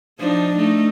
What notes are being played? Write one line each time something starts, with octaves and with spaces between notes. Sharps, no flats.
F3 D4 D#4
A3 D#4